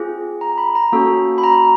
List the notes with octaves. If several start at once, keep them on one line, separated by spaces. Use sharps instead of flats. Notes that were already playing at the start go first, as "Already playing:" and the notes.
Already playing: C4 F4 G#4
A#5
B5
A#5
A#3 C#4 F#4 A4
B5
A#5